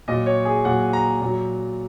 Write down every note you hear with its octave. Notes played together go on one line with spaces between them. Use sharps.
A#2 F#3 D#5
C#5
G#4
A#2 F#3 F#5
A#5
A#2 F#3